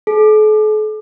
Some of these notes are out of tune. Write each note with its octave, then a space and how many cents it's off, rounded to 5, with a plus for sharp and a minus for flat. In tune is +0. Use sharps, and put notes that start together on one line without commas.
A4 -45